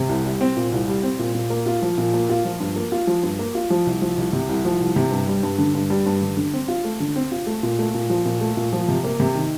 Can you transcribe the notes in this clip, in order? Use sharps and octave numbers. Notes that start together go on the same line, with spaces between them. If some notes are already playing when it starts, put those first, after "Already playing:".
Already playing: C3
C2
G3
C4
A#2
C2
G3
C4
A#2
A#2
A#3
F4
F3
A#2
A#3
F4
F3
G2
A#3
F4
F3
G2
A#3
F4
F3
C2
F3
C2
C3
C2
F3
C2
C3
G2
G3
G2
D3
G2
G3
G2
D3
D3
C4
F4
A3
D3
C4
F4
A3
A#2
A3
A#2
F3
A#2
A3
A#2
F3
C3
A#3
C3
D#3